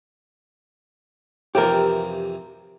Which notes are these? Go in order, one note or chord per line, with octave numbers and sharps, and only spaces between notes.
F2 C3 E3 G4 A#4